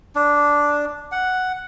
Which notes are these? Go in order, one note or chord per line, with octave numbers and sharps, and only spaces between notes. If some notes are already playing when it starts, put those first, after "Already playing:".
D4
F#5